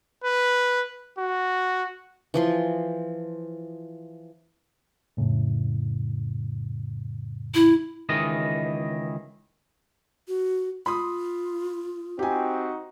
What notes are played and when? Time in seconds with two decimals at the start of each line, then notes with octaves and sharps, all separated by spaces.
0.24 B4
1.18 F#4
2.34 E3 F3 C6
5.17 F2 A2 C#3
7.54 E4
8.09 C#2 D#3 E3 D#5
10.28 F#4
10.86 F4 B5 C6 D#6
12.19 C4 D#4 F#4 G4 G#5